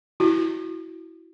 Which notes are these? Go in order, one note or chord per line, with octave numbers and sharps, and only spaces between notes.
E4 F#4